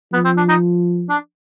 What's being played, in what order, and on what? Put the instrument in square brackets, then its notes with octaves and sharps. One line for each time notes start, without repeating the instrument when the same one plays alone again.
[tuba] F3 [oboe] B3
[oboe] C4
D4
D#4
D4